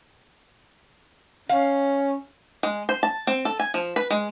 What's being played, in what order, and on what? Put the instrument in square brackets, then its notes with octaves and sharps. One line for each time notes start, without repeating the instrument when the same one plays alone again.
[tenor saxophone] C#4 [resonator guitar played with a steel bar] F5
[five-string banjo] G#3
C5
A5
C4
A4
G#5
F3
B4
G#3